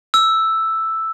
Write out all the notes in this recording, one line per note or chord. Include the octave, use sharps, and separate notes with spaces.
E6